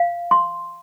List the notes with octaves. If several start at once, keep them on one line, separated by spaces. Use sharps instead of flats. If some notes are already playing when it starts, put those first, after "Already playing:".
Already playing: F5
C6